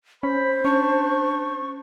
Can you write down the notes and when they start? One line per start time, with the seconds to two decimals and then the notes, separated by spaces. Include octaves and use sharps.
0.23 C#4 C5 B5
0.65 C#4 D4 C#6